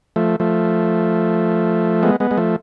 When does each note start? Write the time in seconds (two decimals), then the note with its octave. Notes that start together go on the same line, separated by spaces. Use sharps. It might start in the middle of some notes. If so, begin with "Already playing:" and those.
0.16 F3 A3
0.40 F3 A3
2.03 G#3 B3
2.20 G#3 B3
2.31 G#3
2.38 F3 A3